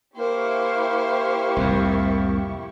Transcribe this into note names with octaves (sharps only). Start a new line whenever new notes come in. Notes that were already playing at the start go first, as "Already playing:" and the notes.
A#3 E4 G4 C5 C#6
C2 F2 A2